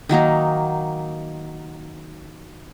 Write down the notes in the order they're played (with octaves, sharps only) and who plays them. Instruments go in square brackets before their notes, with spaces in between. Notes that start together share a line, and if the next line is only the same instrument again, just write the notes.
[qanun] D#3 F#3 A#3 D#4